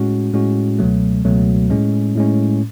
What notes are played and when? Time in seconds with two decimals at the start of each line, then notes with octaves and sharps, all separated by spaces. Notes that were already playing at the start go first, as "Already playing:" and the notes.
Already playing: A2 G#3 C#4 F#4
0.33 A2 G#3 C#4 F#4
0.79 C#2 B2 F#3 A3
1.25 C#2 B2 F#3 A3
1.70 A2 G#3 C#4
2.15 A2 G#3 C#4